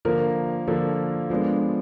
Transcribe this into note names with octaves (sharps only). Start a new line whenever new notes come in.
D3 F3 A#3 A#4
D3 F3 A#3 A4
F3 G#3 B3 D4